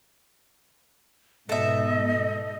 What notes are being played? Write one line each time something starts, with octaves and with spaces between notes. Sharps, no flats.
G#2 B2 A4 D#5 E5